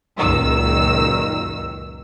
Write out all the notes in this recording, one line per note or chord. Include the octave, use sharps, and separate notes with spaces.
C#2 F#2 A#2 D#3 E6